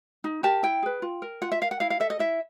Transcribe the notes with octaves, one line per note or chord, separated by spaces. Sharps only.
D#4
G4 A#4 A5
E4 G5
G#4 B4
F4
A#4
F4 F#5
E5
A#4 F5
F#5
E4 F5
F5
A4 E5
D#5
E4 E5